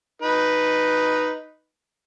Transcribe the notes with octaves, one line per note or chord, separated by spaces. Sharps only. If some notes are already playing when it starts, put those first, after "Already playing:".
D#4 B4